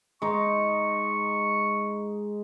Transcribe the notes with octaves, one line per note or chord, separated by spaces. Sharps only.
G#3 D#4 C#6